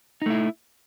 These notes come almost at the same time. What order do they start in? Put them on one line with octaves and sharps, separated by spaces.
D#4 A3 E4